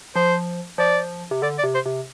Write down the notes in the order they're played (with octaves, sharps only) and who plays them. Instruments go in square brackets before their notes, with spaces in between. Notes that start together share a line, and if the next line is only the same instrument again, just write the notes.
[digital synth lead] F3 [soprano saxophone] C5
[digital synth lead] F3 [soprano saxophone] D5
[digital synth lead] C3
[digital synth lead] D3 [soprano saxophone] D5
[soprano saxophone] D5
[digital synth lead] C3
[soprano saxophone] C5
[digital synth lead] C3